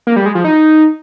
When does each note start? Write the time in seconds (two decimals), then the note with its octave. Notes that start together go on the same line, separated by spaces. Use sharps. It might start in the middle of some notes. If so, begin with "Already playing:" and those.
0.07 A#3
0.16 G3
0.26 G#3
0.35 F3
0.45 D#4